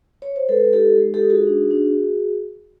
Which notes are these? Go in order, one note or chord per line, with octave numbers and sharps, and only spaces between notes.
C#5
C5
G#3 A4 B4
D#4 G4 A4
G#3
G4 A4
D#4
F#4 G#4
D4
D4